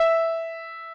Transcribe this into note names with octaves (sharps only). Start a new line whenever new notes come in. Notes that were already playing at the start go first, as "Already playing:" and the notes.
Already playing: E5